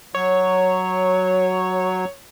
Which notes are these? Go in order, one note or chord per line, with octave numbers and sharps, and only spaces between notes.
F#3 C#5